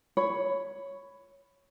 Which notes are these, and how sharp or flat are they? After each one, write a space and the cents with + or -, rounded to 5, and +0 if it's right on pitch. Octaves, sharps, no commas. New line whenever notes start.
C#5 +0 B5 +10